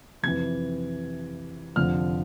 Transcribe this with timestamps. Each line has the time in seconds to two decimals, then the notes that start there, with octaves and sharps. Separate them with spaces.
0.23 F2 C3 E3 G#6
1.76 F1 F2 D3 F3 F6